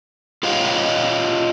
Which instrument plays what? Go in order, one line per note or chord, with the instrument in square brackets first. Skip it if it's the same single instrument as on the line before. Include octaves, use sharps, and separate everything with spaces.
[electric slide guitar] F4 G4 C#5 D#5 F5